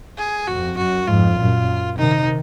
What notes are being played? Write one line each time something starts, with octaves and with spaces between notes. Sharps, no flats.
G#4
F2 F#4
F#2 F#4
F2 G#2 F4
F#2 A#2
C3 D#3 D#4